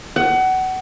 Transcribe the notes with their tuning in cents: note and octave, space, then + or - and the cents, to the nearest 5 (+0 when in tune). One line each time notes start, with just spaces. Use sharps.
F#5 +25